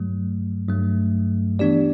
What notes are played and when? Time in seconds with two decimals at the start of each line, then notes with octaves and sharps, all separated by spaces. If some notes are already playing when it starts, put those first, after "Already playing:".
Already playing: G2 F#3 A3
0.68 G2 F#3 A3
1.59 E3 B3 D4 G4 D5